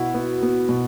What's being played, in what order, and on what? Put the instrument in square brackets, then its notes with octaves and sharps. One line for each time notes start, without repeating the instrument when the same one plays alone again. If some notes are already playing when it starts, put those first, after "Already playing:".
Already playing: [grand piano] B2 B3 E4 [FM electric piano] F#4
[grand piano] B3
B3
B2